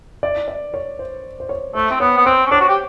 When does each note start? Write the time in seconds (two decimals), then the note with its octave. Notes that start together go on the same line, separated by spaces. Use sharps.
0.23 D5
0.48 D5
0.74 C#5
0.99 C5
1.40 C5
1.49 C#5
1.75 A3 C5
1.91 C4
2.00 B3 C#5
2.18 B3
2.26 C4 C5
2.46 C#4
2.51 D4 C#5
2.60 F#4
2.69 G4